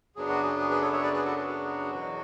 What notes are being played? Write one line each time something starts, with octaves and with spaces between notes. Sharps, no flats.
F#2 C#3 F#3 B3 D4 G#4
F#4
G#4
G#4
G#4 B4
A4 C#5
C#5 E5
B4 D5
G#4 B4
F#4 A4
G#4
F#4
E2 B2 F#3